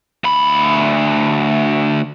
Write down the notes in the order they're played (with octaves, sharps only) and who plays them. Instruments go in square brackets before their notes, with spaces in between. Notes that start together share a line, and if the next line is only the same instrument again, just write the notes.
[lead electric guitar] D2 B5